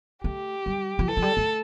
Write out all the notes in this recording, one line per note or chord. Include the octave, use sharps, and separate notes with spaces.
A3 G4
G3
F3
E3 A4
F3
G3
A3